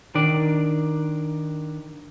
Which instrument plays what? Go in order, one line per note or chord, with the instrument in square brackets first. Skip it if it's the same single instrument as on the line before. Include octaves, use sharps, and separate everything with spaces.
[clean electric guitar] D#3 D4 D5